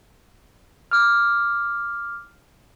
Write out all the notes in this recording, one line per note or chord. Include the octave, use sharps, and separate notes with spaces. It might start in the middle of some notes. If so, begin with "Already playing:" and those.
D6 F6